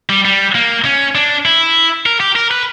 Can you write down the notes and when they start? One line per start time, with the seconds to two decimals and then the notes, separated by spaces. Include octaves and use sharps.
0.09 G3
0.25 G3
0.55 A#3
0.85 C#4
1.15 D4
1.45 E4
2.06 A#4
2.20 G4
2.36 A#4
2.51 B4